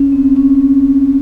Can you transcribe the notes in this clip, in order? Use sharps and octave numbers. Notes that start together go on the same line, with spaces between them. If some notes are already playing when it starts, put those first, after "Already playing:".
Already playing: C#4
C4
C#4